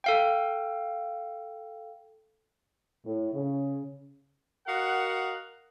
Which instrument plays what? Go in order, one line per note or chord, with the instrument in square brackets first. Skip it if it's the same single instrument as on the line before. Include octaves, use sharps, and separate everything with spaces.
[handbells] A4 F5 G5
[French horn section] A2
C#3
[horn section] F#4 A#4 D#5 F5 F#5